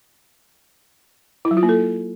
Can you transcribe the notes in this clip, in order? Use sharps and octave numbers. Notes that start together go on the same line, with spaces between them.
E4
F#3
F4
A#3
A4